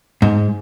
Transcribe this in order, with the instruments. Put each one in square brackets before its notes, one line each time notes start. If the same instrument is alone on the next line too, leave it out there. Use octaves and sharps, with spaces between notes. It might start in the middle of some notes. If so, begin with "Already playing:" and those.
[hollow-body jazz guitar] G#2